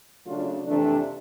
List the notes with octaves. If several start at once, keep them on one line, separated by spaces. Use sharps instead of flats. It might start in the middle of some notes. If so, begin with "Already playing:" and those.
C#3 F#3 A3 D4 F4
F2 C3 E3 A3 D4